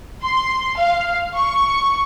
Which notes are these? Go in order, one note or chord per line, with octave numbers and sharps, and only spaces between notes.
C6
F5
C#6